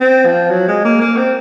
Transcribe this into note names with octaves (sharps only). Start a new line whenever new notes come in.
C4
F3
F#3
G#3
A#3
A#3
C4